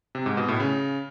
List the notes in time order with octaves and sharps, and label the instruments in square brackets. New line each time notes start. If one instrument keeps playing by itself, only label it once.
[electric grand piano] C3
G#2
B2
A2
C#3